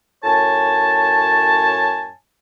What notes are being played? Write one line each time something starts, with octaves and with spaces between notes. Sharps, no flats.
F#2 A2 C#5 G#5 A5